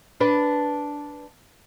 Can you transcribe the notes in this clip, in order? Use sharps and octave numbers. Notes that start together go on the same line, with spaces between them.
D4 B4